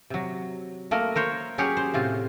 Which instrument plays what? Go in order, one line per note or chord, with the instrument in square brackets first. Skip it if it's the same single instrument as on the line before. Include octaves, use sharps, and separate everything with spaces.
[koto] C3 F#3
A3 A#3 A#4
A#4 C5 C#5
F#3 C#4 G4 G#4 C#5
C5
A2 C3 F4